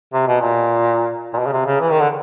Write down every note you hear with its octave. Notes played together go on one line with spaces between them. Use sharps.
C3
B2
A#2
A#2
B2
C#3
C3
C#3
E3
D#3
D3